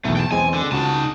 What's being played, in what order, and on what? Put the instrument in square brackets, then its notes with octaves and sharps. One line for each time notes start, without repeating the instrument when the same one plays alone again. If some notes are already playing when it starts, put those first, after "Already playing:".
[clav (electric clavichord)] B1 E2 [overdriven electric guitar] A3
[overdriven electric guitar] G5 A5
[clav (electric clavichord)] E2 G#3 C4 [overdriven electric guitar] G#5
[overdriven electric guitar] D3
[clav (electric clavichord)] C#2 F#4 [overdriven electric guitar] D#4 A5